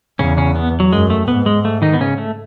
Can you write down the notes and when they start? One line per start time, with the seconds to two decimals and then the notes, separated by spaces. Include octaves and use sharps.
0.19 E2 C#3 C#4
0.38 C#3 C#4
0.56 B3
0.80 F#3
0.92 F#2 G#3
1.10 A3
1.28 G#2 B3
1.46 G#3
1.65 A3
1.82 D#3 D#4
1.94 B3
2.00 C#3 C#4
2.18 A3